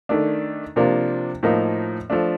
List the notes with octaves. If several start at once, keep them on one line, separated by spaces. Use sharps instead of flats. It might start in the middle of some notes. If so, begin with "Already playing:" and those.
D#3 A3 D4
C3 F3 A#3 D4
A2 F3 A#3 D#4
F3 A3 D4